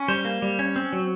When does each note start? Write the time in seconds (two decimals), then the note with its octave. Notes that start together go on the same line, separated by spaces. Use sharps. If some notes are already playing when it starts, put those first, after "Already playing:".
Already playing: C#4
0.08 G3 C5
0.25 A#3
0.42 G3
0.59 C#4
0.76 C4
0.93 F#3